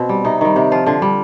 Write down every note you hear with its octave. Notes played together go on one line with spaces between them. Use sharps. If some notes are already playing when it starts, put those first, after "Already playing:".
Already playing: B2 C4
G3
C3 D#4
D#3 G3
C3 G4
F3 F4
D3 F4
G3